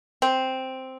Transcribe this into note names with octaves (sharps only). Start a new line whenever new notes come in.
C4